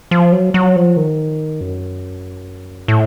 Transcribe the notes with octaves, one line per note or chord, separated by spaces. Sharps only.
F3
F#3
F#3
F3
D#3
F#2
A2